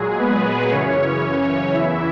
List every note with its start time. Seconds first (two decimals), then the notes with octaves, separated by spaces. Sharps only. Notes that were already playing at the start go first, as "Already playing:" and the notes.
Already playing: A#2 F#3 G#3 G#4
0.19 B3 B4
0.71 F#2 C#3 E3 C#4 C#5
1.22 C#4 C#5
1.74 E2 C#3 E3 E4 E5